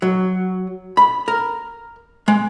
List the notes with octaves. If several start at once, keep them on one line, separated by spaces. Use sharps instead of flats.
F#3
B5
A#4
G#3